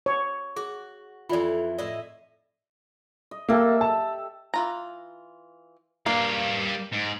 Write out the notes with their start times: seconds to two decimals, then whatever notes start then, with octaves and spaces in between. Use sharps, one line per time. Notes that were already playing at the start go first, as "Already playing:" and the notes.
0.06 C#5
0.56 F#4 G#4
1.29 F2 E3 F4 D5
1.78 A2 E4 D5 D#5
3.31 D#5
3.49 A#3 G4 A4 E5
3.81 A5
4.54 E3 F4 A#5
6.06 G3 A#3 D4 F5
6.93 G#2